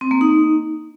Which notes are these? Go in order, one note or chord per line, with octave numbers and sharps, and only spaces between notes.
C4
A#3
D#4